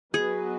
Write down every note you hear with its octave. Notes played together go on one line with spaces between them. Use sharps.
F#3 B3 F#4 G#4 B4 D#5